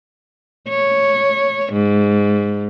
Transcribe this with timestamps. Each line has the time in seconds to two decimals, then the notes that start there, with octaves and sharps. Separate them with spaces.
0.69 C#5
1.73 G#2